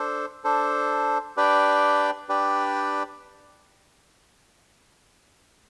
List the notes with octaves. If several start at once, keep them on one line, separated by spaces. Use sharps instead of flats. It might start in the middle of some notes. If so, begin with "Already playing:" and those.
Already playing: D4 A4 C5
D4 A4 C5
D4 G4 B4 D5 G5
D4 G4 B4 D5 G5